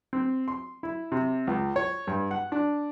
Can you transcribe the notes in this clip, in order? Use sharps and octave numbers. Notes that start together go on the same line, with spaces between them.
C4
C6
E4
C3
C#2
C#5
G2
F#5
D4